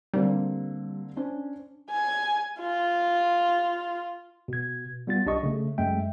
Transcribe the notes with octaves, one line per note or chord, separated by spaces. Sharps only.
D3 G3 A#3 C4
C#4 D4 C5
G#5
F4
B2 G#6
G3 B3 F4 A6
B1 D4 G4 D#5 C#6
C#3 A3
F#2 G#3 A3 E5 G5